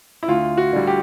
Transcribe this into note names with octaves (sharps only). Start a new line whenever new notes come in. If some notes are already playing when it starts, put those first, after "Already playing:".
E4
D2 F4
F#4
D3 G3
G4